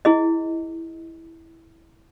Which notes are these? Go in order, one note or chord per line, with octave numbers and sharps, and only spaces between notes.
E4 G#4 D#5